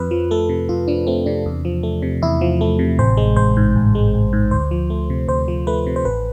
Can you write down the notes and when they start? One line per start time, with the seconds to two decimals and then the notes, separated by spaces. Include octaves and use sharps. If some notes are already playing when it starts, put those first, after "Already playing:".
Already playing: F2 B4
0.11 F3
0.31 A3 A4
0.49 C3
0.69 F2 F4
0.88 F3 D4
1.07 A3 C4
1.26 C3 D4
1.46 E2
1.65 F3
1.83 A3
2.02 C3
2.22 E2 E4
2.41 F3
2.61 A3
2.79 C3
2.99 A1 C5
3.17 G#3
3.36 A1 C5
3.57 G#2
3.76 A1
3.95 G#3
4.14 A1
4.33 G#2
4.51 D2 C5
4.71 F3
4.90 A3
5.10 C3
5.28 D2 C5
5.48 F3
5.67 A3 B4
5.86 C3
5.96 C5
6.05 A1 B4